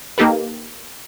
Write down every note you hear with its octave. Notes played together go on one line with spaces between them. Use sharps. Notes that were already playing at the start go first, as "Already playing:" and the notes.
A#3 D#4 G4 A4 B4